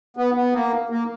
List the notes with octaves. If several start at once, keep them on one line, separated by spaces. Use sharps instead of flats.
B3
B3
A#3
A#3